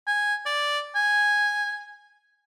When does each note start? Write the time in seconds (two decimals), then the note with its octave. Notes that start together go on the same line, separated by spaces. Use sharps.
0.07 G#5
0.46 D5
0.96 G#5